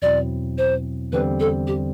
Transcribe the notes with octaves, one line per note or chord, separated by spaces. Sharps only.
E2 B2 F#3 C4 E4 D5
C5
E2 D3 G3 C4 B4
A4
G4